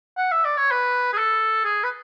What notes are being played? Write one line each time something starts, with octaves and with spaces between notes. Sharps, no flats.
F#5
E5
D5
C#5
B4
G#4
A4
G#4
B4